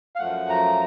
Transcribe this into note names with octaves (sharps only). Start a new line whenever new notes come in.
F5
F#2 F3 A3 F#5
A#5